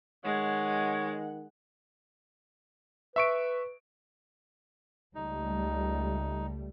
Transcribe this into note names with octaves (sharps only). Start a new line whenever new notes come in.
D#3 G#3 C#5 F#5
B4 E5 C#6 D7
C#2 G3 A3 D#4